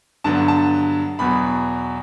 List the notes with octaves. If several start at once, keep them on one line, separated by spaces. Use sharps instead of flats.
G2 D3 F#3 B3 A5
A5
E2 B2 F#3 B5